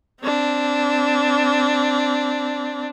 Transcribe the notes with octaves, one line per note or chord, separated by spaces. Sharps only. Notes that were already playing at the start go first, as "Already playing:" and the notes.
C4 D4